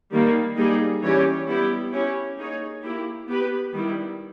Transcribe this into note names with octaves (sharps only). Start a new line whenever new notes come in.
D#3 G3 A#3
G3 A#3 D#4 G#4
E3 G3 C#4 G4 C#5
G3 B3 E4 G4
C#4 E4 G4 C#5
A#3 D#4 G#4 C#5
A#3 E4 G4
B3 G4 B4
D#3 G3 B3 E4